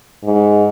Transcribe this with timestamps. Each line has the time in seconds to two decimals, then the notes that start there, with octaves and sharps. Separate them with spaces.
0.23 G#2